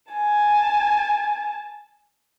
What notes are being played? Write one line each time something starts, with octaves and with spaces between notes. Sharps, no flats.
G#5 A5